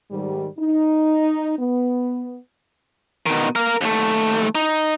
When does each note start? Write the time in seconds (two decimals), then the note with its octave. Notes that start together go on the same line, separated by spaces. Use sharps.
0.11 G#2 D#3 G3
0.59 D#4
1.59 B3
3.26 B2 D#3
3.56 A#4 F5
3.81 D#2 A3
4.55 D#4